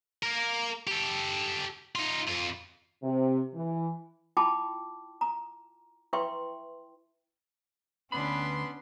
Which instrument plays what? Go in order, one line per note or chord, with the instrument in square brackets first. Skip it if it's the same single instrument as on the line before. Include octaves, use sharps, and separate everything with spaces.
[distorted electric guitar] A#3 A#4
G4 A4
D#4 F4
F2 F4
[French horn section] C3
E3
[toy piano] E4 F4 G5 A5 B5 D6
A#5
E4 B4 E5 G5 C6 C#6
[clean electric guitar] D2 G#2 B5 [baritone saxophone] B3 [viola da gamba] C#4 D4 B4 [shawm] C6